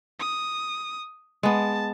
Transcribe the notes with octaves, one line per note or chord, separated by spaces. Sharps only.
D#6
G#3 B3 A5